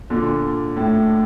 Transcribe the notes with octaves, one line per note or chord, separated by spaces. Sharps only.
A#2 D3
A2